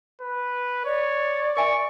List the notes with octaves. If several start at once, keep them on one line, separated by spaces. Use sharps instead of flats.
B4
C#5 D5
A#4 E5 G#5 C#6